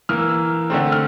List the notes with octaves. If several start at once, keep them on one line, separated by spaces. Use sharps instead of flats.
E3 A#3 F6
E6
E6
D3 A3 C4
F6